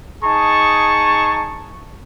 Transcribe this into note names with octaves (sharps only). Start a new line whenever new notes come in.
D#4 G#4 A5 C#6